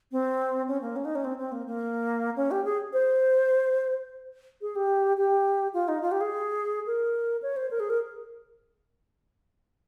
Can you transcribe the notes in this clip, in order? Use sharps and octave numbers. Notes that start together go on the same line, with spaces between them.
C4
C#4
A#3
C#4
D#4
C#4
C4
C4
A#3
A#3
C#4
G4
G#4
C5
G#4
G4
G4
F4
D#4
F4
G4
G#4
A#4
C#5
C5
A#4
G#4
A#4